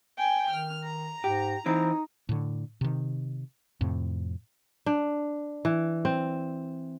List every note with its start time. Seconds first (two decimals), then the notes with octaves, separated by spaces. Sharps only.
0.17 G5 G#5
0.49 D#3 F6
0.82 A#5
1.24 G#2 G4
1.66 E3 C4 D#4
2.29 A2 D3
2.81 C3 D#3
3.81 F2 A2 C3
4.86 D4
5.65 E3
6.05 C4